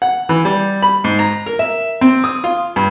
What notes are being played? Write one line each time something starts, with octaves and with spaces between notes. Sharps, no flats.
F#5
E3
G3
B5
G#2
A#5
A#4
E5
C4
D#6
F4
G2